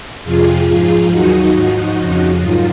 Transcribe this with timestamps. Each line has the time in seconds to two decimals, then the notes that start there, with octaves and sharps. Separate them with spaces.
0.23 F2 C3 F3 F4 G#4
0.67 G#2 F3 F4 G#4
1.10 D#2 D#3 F#3 D#4 F#4
1.54 G#2 F3
1.96 F2 C#3 F3
2.40 G#2 D#3 F#3 F4